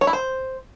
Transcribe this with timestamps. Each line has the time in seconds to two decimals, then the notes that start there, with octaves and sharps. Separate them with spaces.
0.01 C#5
0.07 E4
0.13 C5